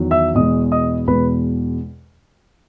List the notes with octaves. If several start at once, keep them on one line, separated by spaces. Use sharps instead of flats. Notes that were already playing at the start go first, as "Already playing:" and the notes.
Already playing: E2 D#3 F#3
E5 E6
E2 B2 G#3 D#5 D#6
D#5 D#6
E2 B2 G#3 B4 B5